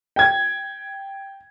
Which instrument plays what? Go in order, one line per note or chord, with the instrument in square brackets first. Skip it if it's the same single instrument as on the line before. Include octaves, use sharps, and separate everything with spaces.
[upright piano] G5 G#6